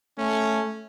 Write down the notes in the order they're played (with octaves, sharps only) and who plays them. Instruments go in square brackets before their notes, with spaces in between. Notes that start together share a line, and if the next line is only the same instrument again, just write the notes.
[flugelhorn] A3 [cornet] C#4